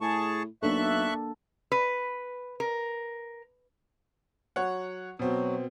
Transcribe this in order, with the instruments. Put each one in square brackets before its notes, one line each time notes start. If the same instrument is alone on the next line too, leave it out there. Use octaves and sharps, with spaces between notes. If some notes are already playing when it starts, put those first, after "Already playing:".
[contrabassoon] A2 [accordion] G#4 A5 C#6
[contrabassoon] B1 [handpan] A#3 D4 A4 [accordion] E5 C#6 F#6
[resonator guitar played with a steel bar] B4
A#4
[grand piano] F#3 C#5 F#5
[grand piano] B2 C4 [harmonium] F#3